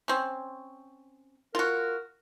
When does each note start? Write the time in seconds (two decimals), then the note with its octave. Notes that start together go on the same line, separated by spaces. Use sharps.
0.08 C4 C#4
1.55 F4 F#4 A#4